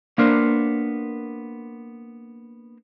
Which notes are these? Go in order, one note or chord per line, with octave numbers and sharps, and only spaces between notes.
A#3 B3 D4 A#4 C5